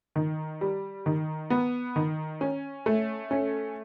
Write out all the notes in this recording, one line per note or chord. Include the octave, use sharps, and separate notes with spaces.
D#3
G3
D#3
B3
D#3
C#4
A3
C#4